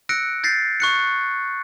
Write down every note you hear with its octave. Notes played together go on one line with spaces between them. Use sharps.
E6 F#6 A#6 C#7 D7
G6 A6 A#6 C7
C#6 F#6 C#7